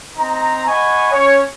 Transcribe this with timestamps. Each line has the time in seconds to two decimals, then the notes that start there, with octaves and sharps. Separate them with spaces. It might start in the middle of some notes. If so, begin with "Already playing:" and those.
0.17 C4 D#4 A#5
0.67 D#5 F#5 G#5 B5 C#6
1.12 C#4 C#5